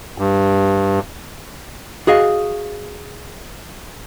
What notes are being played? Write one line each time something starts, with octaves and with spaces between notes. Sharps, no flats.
G2
F#4 G#4 D#5 F5